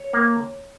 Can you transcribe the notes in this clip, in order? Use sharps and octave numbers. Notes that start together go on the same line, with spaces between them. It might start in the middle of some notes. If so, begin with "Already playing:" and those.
Already playing: C#5
A#3